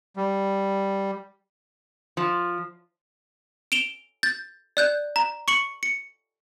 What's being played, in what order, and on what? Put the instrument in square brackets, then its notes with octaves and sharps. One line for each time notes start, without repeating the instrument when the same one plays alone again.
[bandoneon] G3
[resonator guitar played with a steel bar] F3
[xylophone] D7 E7 F7 G7
G6 A6
D5 F#6 G6
A#5
C#6 C#7 F#7
C#7